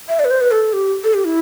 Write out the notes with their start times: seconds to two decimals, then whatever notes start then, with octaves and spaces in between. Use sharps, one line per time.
0.09 E5
0.19 D5
0.25 B4
0.31 C5
0.41 B4
0.51 A4
0.73 G4
1.04 A4
1.14 G4
1.26 E4